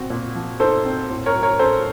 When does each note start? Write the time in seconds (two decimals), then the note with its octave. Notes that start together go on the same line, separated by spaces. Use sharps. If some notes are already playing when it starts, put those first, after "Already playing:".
Already playing: A#2 C4 F#4
0.10 A#2
0.35 F3
0.60 D#4 A4 C5
0.85 C4
1.10 A2
1.26 A#4 C#5
1.35 F#3
1.43 A#4 C#5
1.59 C#4 A4 C5